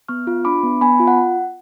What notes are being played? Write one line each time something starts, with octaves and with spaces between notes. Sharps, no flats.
B3 C#6 F6
F4
D4 B5 D6
B3
B3 G#5 B5
F4
F#5